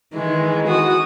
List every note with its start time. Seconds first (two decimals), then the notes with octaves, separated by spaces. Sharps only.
0.13 D#3 E3 G#3
0.68 F#4 D#6